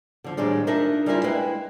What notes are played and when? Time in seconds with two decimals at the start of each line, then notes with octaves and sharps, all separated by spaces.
0.24 D3 F3
0.37 A2 D#3 G3 G#3 C4 D4
0.67 D4 D#4 F4 A#4 D#5 E5
1.06 G3 G#3 E4 F4 A#4 E5
1.24 G#3 E4 B4 F5 G5